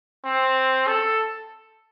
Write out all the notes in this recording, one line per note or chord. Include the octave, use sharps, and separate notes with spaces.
C4
A4